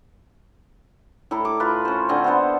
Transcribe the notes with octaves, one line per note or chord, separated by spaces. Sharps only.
A2 E4 A4 A#5
D6
F4 B4
C#4 C5
D3 C4 D#5 G#5
B3 E4 A4 C5